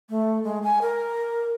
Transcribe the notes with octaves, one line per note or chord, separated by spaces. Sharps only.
A3
G#3
G#5
A#4